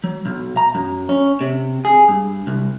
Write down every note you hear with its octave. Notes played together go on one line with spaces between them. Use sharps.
F#3
B1
A#5
F#2
C#4
C3
G#4
G2
C2